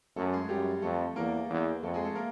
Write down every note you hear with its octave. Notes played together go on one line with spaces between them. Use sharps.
F#2 A3 A4
G#3 G#4
F#2 G3 G4
F2 A3 A4
E2 A#3 A#4
E2
F2 A3 A4
G#3 G#4
A3 A4
A#3 A#4